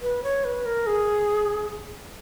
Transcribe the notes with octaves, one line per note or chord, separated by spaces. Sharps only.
B4
C#5
B4
A#4
G#4